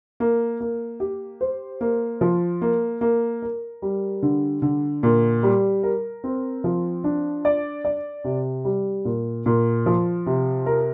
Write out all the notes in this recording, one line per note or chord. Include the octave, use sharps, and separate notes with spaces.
A#3
A#3
G4
C5
A#3
F3
A#3
A#3
A#4
G3
D3
D3
A#2
G3
A#4
C4
F3
D4
D5
D5
C3
G3
A#2
A#2
F3
C3
A#4